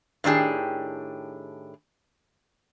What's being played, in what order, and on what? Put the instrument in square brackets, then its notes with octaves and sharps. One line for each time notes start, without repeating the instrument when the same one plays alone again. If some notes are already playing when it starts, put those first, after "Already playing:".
[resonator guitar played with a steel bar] A2 D#3 D4 G4 G#4